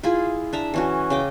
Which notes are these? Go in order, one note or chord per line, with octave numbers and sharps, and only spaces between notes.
E4 F4 G#4
D4 E5 A#5
E3 C#4 F#4
C#3 D#5 G5 D6